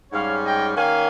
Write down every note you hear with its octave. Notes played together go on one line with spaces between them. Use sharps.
G#2 G3 C#4 C#5 F5
D#5 G5
D#3 A#3 C#4 F5 G#5